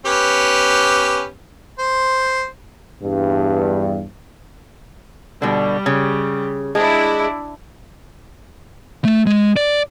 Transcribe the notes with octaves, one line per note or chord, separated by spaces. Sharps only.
B3 C#4 G4
C5
E2 G2
B2 D3 G3
C#3
G#3 D4 E4
A3
G#3
D5